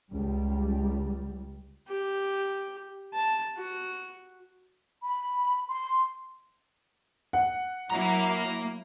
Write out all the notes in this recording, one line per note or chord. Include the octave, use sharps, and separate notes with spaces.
C#2 G3
G4
A5
F#4
B5
C6
F#5
F#3 A#3 E4 A#5